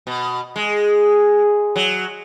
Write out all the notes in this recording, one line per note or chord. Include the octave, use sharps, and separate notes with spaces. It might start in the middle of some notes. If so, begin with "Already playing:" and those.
B2
G#3
F#3